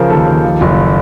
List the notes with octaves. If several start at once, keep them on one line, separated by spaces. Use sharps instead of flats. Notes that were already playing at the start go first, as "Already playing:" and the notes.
Already playing: C#3 F3 A#4 C5
D#2 A4
D#2
F3
F#1